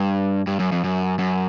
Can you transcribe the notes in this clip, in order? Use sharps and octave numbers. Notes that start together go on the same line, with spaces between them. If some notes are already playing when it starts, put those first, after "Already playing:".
Already playing: G2
G2
F#2
F2
F#2
F#2